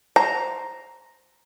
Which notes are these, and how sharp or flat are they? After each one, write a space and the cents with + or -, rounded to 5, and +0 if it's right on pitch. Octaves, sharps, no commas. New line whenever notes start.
C5 +0 A#5 +0